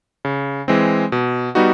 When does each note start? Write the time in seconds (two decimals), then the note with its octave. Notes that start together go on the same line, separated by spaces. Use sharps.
0.25 C#3
0.68 E3 G#3 C4
1.12 B2
1.55 G3 B3 D#4 F#4